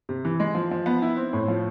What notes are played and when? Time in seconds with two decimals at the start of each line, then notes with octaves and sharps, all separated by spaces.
0.09 C3
0.25 E3
0.40 G#3
0.55 F3
0.71 F3
0.86 B3
1.02 E4
1.17 C4
1.33 A2
1.48 F3